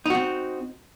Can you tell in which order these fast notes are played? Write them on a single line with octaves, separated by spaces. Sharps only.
D#4 F#4 C4